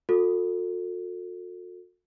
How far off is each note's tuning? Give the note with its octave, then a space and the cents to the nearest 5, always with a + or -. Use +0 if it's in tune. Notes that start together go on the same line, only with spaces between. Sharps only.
F#4 -45 A4 +25